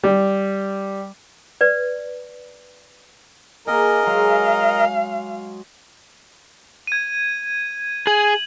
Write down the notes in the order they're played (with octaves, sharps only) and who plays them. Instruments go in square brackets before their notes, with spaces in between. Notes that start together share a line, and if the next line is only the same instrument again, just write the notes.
[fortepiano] G3
[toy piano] B4 D5
[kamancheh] A#3 [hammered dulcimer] G#4 [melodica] A#4 D#5
[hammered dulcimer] F#3 G#3 [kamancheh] F5
[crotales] G#6 D#7
[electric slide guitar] G#4 [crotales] F#7